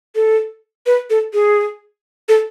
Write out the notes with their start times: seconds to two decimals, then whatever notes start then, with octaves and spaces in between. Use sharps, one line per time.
0.15 A4
0.86 B4
1.10 A4
1.34 G#4
2.29 A4